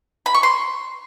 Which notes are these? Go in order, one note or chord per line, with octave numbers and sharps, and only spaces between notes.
B5
C#6
C6